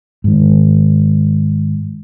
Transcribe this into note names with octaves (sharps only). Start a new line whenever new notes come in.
G#2 D#3